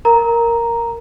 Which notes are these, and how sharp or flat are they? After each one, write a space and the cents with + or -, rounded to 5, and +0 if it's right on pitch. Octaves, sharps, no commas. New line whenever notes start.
A#4 +0 A#5 +0